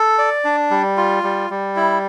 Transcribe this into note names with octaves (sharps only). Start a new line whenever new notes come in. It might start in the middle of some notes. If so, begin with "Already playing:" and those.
Already playing: A4
D5
D4
G3
F4
G3
G3
E4